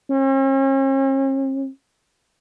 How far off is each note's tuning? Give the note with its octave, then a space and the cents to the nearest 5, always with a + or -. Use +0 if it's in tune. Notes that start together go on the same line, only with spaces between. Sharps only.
C#4 -45